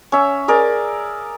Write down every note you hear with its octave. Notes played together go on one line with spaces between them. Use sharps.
C#4 E5
G#4 A#4 D5